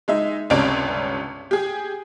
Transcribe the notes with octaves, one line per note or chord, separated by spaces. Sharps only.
G#3 D#4 E5
G1 C#2 C3 C#4 D5 D7
G4 G#4